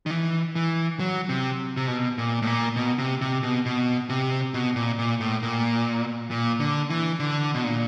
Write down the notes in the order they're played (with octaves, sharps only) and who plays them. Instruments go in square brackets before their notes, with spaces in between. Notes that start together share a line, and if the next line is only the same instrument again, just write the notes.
[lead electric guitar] D#3
E3
E3
F#3
C3
C3
B2
A#2
A2
A#2
B2
C3
C3
B2
B2
C3
B2
A#2
A#2
A2
A#2
A#2
D3
E3
D3
B2
A#2